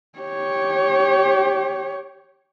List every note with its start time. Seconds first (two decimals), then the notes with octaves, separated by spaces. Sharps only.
0.19 G4 C#5